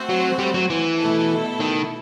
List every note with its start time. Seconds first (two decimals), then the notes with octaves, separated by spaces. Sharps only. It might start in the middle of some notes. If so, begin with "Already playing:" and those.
Already playing: A3 C4 F#4 C5
0.09 F#3
0.39 G3
0.54 F#3
0.70 E3
0.99 B2 A3 E4 A4
1.60 D#3